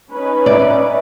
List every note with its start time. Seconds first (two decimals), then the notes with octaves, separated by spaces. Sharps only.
0.11 C#4 D#4 B4
0.46 D5 E5